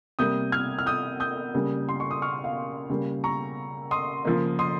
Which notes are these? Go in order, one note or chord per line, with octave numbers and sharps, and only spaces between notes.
C3 G3 A#3 D#6 G6
F6 G#6
F6
D#6 G6
D#6 G6
C#3 G3 A#3
C6
C#6
D#6
C#6 F6
F5
C#3 G3 A#3
A#5 C#6
C6 D#6
C#3 F3 A#3
C6 D#6